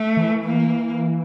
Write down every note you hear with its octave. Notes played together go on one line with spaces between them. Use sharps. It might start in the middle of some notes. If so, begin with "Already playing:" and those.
Already playing: A3
E3
A#3